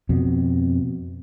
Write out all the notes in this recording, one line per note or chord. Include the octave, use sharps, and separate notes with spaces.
F2 B2